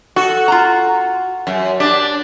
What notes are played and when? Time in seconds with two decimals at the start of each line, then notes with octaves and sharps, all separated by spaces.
0.16 F#4 A4
0.48 F4 A#5
1.47 F#2
1.80 D4 G4